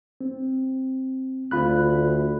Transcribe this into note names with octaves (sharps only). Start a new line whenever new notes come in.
C4
D2 F4 B5 F#6